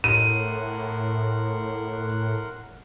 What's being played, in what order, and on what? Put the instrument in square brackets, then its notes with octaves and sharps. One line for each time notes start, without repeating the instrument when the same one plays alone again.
[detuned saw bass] A2 [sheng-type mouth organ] A#4 F#5 C6 [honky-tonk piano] D#7